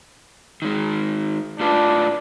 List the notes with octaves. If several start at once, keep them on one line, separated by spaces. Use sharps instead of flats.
D#3 G#3
A2 D4 F4 B4